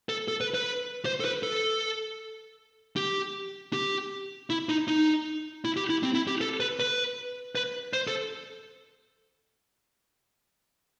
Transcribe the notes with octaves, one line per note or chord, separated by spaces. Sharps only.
A4
A4
B4
B4
C5
A4
B4
A4
G4
G4
E4
D#4
D#4
E4
G4
E4
C4
E4
G4
A4
B4
B4
B4
C5
A4